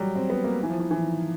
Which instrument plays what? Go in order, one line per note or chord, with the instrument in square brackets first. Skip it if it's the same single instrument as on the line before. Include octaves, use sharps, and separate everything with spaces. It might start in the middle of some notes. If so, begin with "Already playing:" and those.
Already playing: [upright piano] F#3 G3
C4
B3
A#3
E3
F3
E3
E3
D#3